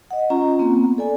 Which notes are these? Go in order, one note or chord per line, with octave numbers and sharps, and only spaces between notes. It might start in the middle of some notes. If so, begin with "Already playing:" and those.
D#5 F#5
C#4 F4 A#5
A#3 C4
B3
A4 D5 G#5